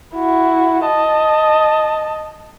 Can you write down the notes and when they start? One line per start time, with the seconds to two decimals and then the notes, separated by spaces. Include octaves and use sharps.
0.15 E4 F#4
0.84 D#5 A5